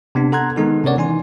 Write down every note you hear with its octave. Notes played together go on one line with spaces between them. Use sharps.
C3 B3 D4
A4 F#5 A#5 C6 F#6 G#6
D#3 G#3 B3 D#4 G#4 A4
C3 C#4 A#4 C#5 D5 F#5
E3 D#4 G#5 C6